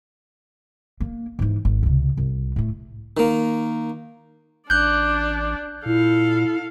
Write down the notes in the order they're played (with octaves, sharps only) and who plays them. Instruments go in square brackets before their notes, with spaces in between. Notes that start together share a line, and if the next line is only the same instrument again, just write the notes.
[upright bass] A#3 D4
G#2 E3
G#1
C#2 C3
C2
A2 A3
[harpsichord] D#3 A#3
[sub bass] A1 [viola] D4 D5 [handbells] F#6 G6
[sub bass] A#2 [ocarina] E4 [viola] A4 F5